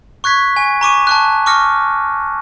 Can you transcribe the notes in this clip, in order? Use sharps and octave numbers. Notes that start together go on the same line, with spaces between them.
C#6 F#6 G#6 B6
G#5
A#5 C#6 D6 D#7
A5 C#6 F#6
C#6 D6 F6 A#6 C#7